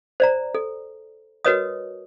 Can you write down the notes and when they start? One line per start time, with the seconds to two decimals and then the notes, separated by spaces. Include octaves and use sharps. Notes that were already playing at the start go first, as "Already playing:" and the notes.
0.20 C5 D5 A#5
0.55 A4
1.45 F#4 A#4 B4 C#5 D#5 D#6